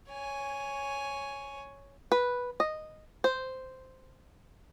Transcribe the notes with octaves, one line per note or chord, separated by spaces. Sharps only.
C#5 G#5
B4
D#5
C5